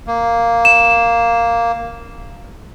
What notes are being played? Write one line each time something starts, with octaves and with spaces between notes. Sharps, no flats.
A#3
E7